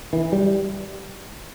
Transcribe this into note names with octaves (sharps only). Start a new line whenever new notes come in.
E3
G3